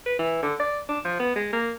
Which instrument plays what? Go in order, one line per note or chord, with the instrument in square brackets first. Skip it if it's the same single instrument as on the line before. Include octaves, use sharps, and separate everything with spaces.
[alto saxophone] B4
E3
D3
D5
D4
F3
B3
G#3
A#3